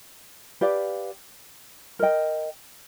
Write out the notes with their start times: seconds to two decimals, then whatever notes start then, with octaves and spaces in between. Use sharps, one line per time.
0.61 G4 B4 D5 F5
1.99 A#4 D#5 G5